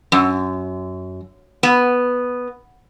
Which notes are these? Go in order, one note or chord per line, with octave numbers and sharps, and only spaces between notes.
F#2
B3